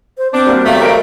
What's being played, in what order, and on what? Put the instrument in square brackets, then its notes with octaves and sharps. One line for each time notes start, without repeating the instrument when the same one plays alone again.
[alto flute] C5
[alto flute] C4 [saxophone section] D4
[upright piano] G3 A#3 F#4
[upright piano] E2 F5 [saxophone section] F#3 G3 A3
[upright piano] A#4 D#5 D7 [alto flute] F5